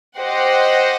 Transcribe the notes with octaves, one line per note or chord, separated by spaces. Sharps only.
G4 C5 D#5 F#5